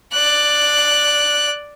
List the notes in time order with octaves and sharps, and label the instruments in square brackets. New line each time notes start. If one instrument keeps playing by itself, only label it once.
[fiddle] D5 F#6